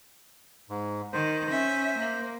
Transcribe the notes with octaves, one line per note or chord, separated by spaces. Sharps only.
G#2
D#3 C5
C#4 E5
A#3